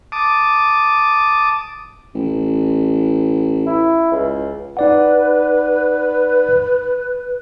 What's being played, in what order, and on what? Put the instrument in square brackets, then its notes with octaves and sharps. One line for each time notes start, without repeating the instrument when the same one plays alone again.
[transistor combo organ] A5 D6 D#6
[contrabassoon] A1
[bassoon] E4
C#2
[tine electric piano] D#4 D5 F#5 [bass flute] B4